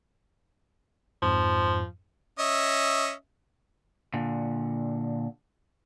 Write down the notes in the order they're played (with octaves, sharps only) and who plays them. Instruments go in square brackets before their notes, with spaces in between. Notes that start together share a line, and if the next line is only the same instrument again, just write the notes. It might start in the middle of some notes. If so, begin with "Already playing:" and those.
[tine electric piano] F2 G#2 [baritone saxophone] F3
[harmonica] C#4 D#5 E5
[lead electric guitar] A#2 D3